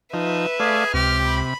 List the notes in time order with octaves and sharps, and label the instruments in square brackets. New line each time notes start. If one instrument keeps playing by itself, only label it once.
[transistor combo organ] F3 D#4 [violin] B4 E5
[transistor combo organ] A3 D5 F5 [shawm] G#4
[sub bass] C#2 [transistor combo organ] C3 [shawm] G4 [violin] F6
[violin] B5